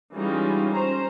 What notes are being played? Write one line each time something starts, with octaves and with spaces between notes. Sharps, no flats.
E3 G3 G#3 C#4 D#4 F4
C#4 C5 A#5